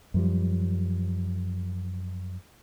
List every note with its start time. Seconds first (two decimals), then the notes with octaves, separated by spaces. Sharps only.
0.14 F#2 F3 G3